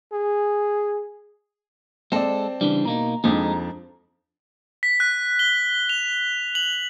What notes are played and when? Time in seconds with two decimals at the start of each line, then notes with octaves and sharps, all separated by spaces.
0.12 G#4
2.12 G#3 C4 A4 D5
2.61 C#3 E3 G3 D4
2.85 B2 A#3 D#4 A#5
3.24 F2 F3 G#3 A#3 D4 D#4
4.83 B6
5.00 F#6
5.39 G7
5.89 F7
6.55 F#7